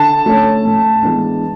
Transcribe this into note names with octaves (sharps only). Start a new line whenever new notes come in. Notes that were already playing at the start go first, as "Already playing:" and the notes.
Already playing: D3 A5
A3 C#4
A2
E3 G#3 B3 D4